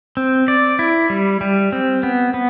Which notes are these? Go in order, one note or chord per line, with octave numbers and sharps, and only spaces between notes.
C4
D5
E4
G3
G3
C4
B3
B3